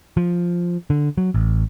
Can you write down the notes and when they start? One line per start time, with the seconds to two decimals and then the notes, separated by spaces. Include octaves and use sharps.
0.17 F3
0.90 D3
1.18 F#3
1.34 A1